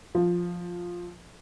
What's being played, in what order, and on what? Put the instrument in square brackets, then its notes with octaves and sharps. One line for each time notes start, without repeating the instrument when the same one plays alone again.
[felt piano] F3